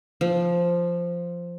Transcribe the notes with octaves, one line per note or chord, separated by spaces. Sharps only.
F3